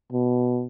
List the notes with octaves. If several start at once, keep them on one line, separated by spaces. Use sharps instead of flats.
B2